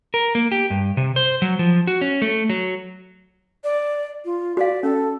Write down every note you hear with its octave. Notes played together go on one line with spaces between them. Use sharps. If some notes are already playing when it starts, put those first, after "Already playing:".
A#4
A#3
G4
G2
C3
C5
F#3
F3
F#4
C#4
A3
F#3
D5
F4
F#4 D5 F5
C#4 A4